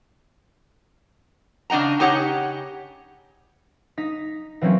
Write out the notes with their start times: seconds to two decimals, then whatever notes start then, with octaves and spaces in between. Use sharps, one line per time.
1.70 C#3 D4 D#5 F#5 A#5
2.00 C#3 D#4 G4 C#5 D#5 F#5
3.98 D#4 B6
4.61 E3 F#3 A#3 C4 C#4 F4